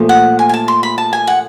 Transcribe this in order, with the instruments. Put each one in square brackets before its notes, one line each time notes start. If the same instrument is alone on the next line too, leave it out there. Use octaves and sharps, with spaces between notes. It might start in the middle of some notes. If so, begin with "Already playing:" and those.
Already playing: [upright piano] A#2 F3 A3
[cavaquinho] F#5
G#5
G#5
A5
C6
B5
A5
G#5
F#5